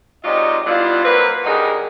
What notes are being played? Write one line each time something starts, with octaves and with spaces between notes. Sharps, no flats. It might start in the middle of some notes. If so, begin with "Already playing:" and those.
G#2 C3 F#3 F4 D5 D#5
G3 B3 D4 E4 F4
F#3 A#3 C4 B4
D3 G3 D#4 F#4 G#4 A#4